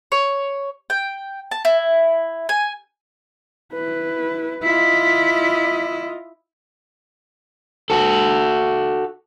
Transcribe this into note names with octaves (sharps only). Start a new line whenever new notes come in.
C#5
G5
A5
E4
G#5
E4 B4
E4 F4 D#5 B6
F#4 A4